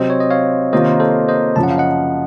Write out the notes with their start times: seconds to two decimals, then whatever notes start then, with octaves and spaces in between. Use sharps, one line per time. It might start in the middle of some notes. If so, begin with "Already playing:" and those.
Already playing: C3 F#3 C4 C5 D#5
0.10 C#5
0.20 D#5
0.30 C#5 F5
0.73 C3 D#3 A#3 F4 C5 D#5
1.00 A4 C5
1.28 C5 D#5
1.56 F#2 C#3 F3 A5
1.63 F#5
1.71 F5
1.78 D#5 F#5